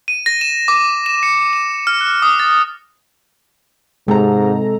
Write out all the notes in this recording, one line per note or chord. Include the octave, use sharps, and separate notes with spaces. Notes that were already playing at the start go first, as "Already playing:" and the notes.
D#7
A#6
E7
D6
E7
C#7
E7
F6
F#6
D#6
A6
G#2 C3 G#3 A4 A#5